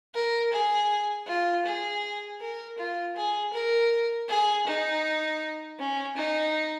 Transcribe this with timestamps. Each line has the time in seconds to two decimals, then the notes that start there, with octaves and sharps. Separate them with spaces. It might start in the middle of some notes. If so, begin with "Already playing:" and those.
0.14 A#4
0.52 G#4
1.27 F4
1.66 G#4
2.41 A#4
2.78 F4
3.16 G#4
3.53 A#4
4.29 G#4
4.66 D#4
5.79 C#4
6.17 D#4